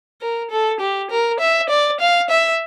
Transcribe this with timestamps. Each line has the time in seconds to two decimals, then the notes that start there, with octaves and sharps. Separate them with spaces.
0.21 A#4
0.51 A4
0.81 G4
1.11 A#4
1.40 E5
1.70 D5
2.01 F5
2.30 E5